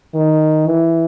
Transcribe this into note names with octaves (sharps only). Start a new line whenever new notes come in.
D#3
E3